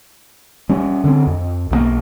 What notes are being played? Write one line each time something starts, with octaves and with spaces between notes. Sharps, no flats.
G3 C#4
D3 C4
F2
B1 D#3 A#3